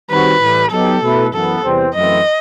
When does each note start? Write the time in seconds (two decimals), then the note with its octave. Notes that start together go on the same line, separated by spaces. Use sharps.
0.10 D#3 G3 C4 F#4 B4
0.41 A2 E3 G3
0.71 F#3 B3 D#4 G4 A4
1.03 B2 A3 E4 B4
1.33 F#2 E3 B3 A4
1.63 E2 C3 E3 G3 C4
1.94 F#2 E3 A3 C4 E4 D#5